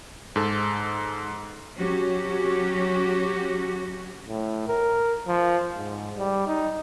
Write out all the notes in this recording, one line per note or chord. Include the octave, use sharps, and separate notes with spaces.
G#2 A4
F#3 C#4 F#4 G4
A2
A#4
F3
G#2
G3
D#4